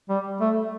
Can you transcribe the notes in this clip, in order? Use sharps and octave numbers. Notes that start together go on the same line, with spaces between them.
G3
A3